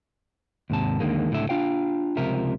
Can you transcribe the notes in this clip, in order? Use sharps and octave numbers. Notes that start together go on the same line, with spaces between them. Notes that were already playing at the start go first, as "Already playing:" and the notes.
D#2 G#2 C3 A5
D#2 D3 D#3 G#3 A#3
C#2 A2 D3 E5
D4 F4 F5 G5
C#2 C3 F3 A#4 E5